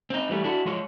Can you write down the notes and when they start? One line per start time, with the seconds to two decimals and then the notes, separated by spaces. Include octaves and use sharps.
0.10 C4 D#4
0.29 E3 G3 A3
0.44 D4 E4 F#4
0.65 F3 G#3 C#5